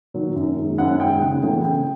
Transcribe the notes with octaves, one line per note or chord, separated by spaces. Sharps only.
D#3 F#3
F#2
D#3 G#3
F#2 F#5
D#3 G#3 G5
C#3 F#5
E3 A3 C#4 E4 G5
C#3 G5